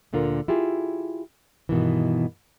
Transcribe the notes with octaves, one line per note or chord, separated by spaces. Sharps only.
D2 A#2 D3 F4 A#4
E4 F4 G4 G#4
G2 B2 D#3 E3